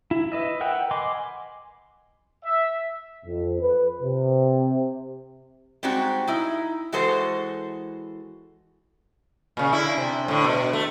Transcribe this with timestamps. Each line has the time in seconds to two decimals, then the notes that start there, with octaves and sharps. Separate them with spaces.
0.11 E4
0.32 B4 D#5 E5
0.61 A#4 B4 F#5 G5 E6
0.91 D#5 G#5 B5 C6 D6
2.45 E5
3.26 F2
3.61 B4
4.02 C3
5.83 G3 G#3 C4 D#4 F#4
6.27 D#4 E4
6.92 E3 G#3 F#4 A4 C5
9.57 A#2 C#3
9.73 D3 E4
9.98 C3
10.28 A2 D3
10.44 B2
10.73 A3